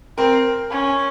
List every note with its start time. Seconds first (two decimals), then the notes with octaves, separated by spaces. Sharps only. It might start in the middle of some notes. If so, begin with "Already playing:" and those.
0.18 C4 A#4 C5
0.71 C#4